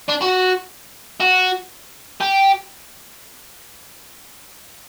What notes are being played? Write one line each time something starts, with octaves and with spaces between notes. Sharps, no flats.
D4
F#4
F#4
G4